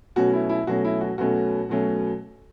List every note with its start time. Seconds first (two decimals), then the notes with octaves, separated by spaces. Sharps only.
0.16 B2 F#3 A3 C#4 F#4
0.33 E4
0.49 E4
0.67 B2 F#3 A3 C#4 F#4
0.84 E4
1.01 F#4
1.18 B2 F#3 A3 C#4 F#4
1.69 B2 F#3 A3 C#4